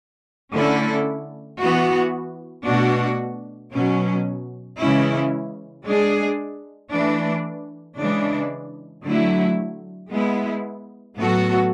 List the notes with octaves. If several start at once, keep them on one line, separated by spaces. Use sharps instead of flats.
D3 A3 C#4 E4 A4
E3 B3 F#4
B2 A3 D4 F#4
B2 F#3 C#4
C#3 E3 G#3 C#4 E4
G#3 D4 G#4
E3 A3 D4
C#3 E3 G#3 D4
D3 F#3 A3 E4
G#3 B3 E4
A2 F#3 B3 F#4 A4